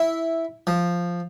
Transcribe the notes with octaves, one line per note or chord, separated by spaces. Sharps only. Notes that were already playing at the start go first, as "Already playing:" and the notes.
Already playing: E4
F3